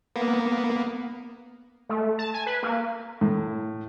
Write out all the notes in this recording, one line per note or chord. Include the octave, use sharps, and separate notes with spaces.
A#3 B3
A3
A5
G#5
B4
A#3
A2